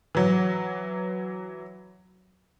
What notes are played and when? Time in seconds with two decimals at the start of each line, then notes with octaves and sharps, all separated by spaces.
0.15 E3 F#3